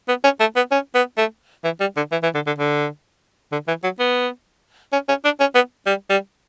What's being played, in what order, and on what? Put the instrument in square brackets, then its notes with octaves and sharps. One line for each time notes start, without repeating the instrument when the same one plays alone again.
[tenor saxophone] B3
C#4
A3
B3
C#4
B3
A3
E3
G3
D3
E3
E3
D3
D3
D3
D3
E3
F#3
B3
C#4
C#4
D4
C#4
B3
G3
G3